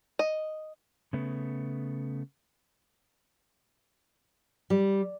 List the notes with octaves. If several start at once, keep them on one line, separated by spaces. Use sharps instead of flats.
D#5
C#3 A3 B3
G3